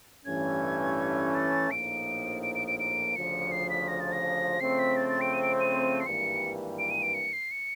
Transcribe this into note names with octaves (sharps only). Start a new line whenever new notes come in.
A1 G2 E3 A3 C#4 G#6
A6
A#1 A2 F3 A#3 D#4 D7
D7
D7
D7
D7
D2 C#3 F3 C#7
C7
B6
A#6
A6
A#6
C#3 F3 A3 C4 C7
B6
A6
A6
D7
D#7
D7
D#7
C7
G#1 G2 E3 G3 A#3 C#7
D7
D#7
D7
C#7
C7
C#7